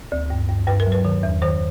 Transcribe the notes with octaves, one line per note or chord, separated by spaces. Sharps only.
D2
G2
G2
G2 B4
A#4
F#3
B4
D#3
E2
D#3 C5